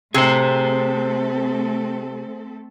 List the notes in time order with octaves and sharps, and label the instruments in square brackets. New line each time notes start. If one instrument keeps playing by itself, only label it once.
[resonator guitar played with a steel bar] C3 [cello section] A3 C4 A4 [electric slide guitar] G#4 C5